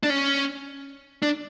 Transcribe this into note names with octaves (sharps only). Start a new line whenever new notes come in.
D4
C#4
D4